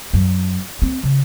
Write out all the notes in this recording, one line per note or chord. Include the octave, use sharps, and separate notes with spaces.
F#2
C4
C#3